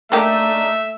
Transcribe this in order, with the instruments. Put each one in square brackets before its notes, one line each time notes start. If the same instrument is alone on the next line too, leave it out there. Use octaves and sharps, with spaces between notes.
[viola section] A3 [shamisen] A#3 G4 [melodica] D4 D#4 D#5 [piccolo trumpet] E5